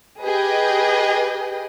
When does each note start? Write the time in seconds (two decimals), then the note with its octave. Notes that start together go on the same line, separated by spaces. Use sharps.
0.23 G4 G#4 B4 D#5 G5